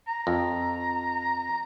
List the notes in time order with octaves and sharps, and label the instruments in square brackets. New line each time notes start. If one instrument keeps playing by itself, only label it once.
[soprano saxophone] A#5
[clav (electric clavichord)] F2